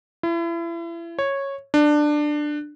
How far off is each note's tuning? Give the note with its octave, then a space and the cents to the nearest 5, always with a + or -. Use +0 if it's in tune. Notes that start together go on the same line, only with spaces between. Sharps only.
E4 +35
C#5 -10
D4 +15